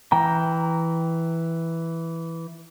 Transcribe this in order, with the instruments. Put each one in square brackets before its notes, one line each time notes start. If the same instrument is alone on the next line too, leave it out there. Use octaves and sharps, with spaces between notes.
[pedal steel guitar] E3 G5 A#5